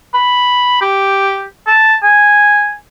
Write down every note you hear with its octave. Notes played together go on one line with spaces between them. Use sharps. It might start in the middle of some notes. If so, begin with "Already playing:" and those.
B5
G4
A5
G#5